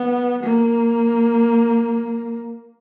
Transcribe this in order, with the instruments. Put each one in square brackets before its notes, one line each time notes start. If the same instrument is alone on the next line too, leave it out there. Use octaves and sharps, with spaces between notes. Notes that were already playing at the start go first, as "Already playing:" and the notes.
Already playing: [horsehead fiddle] B3
A#3